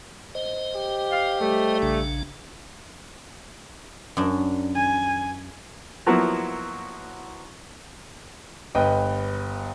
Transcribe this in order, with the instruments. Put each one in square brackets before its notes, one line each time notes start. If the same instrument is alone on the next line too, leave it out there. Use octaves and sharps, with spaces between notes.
[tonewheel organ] C5 D#5
[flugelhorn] G4
[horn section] F5
G3 A3
[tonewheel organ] A#1 C#3 D4
[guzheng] F#2 D4
[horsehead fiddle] G#5
[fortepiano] F3 F#3 A#3 B3 E4 F#4
[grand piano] G1 B4 D#5 G5